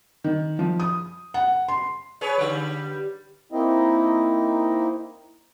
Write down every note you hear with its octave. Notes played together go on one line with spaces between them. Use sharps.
D#3
F3
D#6
F#5
C6
G#4 B4 C#5
D3 G3
A#3 C4 D#4 E4 D#5